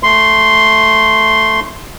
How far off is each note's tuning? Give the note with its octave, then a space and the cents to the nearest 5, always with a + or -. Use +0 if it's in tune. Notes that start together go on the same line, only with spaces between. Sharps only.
A3 +0 C6 +0